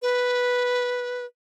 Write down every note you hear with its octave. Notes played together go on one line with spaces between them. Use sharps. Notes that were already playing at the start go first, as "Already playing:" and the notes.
B4